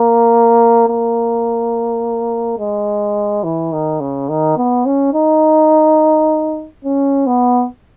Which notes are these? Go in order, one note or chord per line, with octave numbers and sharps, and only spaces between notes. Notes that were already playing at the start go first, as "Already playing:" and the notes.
Already playing: A#3
A#3
G#3
E3
D#3
C#3
D#3
B3
C#4
D#4
C#4
B3